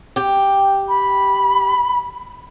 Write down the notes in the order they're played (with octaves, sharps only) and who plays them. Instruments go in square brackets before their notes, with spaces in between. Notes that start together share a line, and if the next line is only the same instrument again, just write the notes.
[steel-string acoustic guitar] G4 G5
[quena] B5